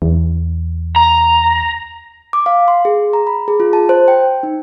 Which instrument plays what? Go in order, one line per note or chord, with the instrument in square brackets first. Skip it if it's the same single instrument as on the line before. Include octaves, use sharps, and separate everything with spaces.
[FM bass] E2
[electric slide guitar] A#5
[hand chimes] D6
F5
C6
G#4
A#5
B5
G#4
F4
A5
C5
G5
D#4